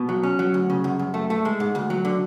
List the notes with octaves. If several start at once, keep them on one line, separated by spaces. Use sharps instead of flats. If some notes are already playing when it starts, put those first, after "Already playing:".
Already playing: B2
F#3
C#4
F#3
D2
C#3
F#2
F#2
A3
A3
G#3
G#2
D2
F#3
D3